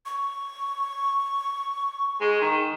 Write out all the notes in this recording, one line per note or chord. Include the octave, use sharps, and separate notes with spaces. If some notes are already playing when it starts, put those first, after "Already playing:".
C#6
G#3
D#3